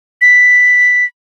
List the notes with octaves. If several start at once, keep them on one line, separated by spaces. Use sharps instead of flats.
B6